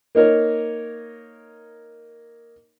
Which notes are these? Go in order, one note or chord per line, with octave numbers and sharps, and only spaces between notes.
A#3 D#4 A#4 C#5